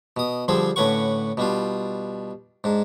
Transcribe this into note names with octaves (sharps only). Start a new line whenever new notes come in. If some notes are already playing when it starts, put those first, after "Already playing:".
B2 D#6
D3 F3 G3 C4 G#4
A2 D3 C#4 B4 F#5 C#6
B2 G3 D4 F4
G#2 D4